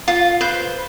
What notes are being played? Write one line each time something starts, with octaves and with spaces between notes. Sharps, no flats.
F4
B4 C5